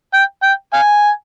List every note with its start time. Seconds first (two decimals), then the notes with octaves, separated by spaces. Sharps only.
0.14 G5
0.43 G5
0.74 F5 G#5